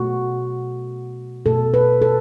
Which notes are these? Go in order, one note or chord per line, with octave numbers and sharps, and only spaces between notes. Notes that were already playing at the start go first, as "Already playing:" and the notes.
Already playing: B2 A3 F#4
B2 A3 A4
B4
A4